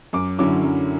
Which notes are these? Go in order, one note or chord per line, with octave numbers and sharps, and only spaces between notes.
F#2 D6
D3 F#3 C#4 E4 D6
F#2